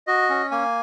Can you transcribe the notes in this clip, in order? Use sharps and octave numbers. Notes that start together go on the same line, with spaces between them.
F#4 D#5
C#4
A#3 G#5